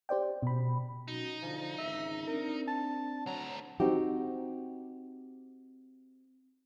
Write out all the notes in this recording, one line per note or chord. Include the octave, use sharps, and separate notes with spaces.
G4 C5 D5 G5
B2 B5
F#3 C#4 D#4 F#4
D3 F3
G#1 C#2 E5
C4 D4 A#4
A5
D2 F#3 A#5
C4 D#4 F#4 G4